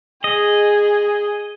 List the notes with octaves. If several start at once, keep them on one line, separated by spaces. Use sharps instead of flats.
G#4 D#5